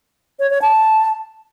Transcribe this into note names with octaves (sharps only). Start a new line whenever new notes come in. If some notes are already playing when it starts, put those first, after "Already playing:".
C#5
C#5
A5